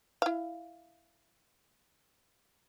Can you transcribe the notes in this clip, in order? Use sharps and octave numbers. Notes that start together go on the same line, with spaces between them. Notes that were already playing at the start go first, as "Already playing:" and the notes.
E4 F5